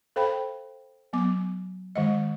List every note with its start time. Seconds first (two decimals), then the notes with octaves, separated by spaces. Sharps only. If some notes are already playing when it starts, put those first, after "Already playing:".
0.16 A4 C5 F5 G5 B5
1.13 F#3 B3 D6
1.96 D#3 G#3 D#5